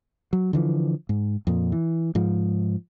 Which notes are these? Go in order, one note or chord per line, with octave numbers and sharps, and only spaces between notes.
F#3
D3 E3 F3
G#2
F2 A#2
E3
G#2 F3